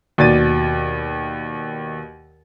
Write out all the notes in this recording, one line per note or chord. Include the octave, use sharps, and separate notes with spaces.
D#2 B2 D5 A6 D#7